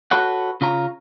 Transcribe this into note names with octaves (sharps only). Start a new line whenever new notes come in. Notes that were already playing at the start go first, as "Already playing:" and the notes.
F#4 A4 B4 C#5 F#5
C#3 F4 C#5 A#5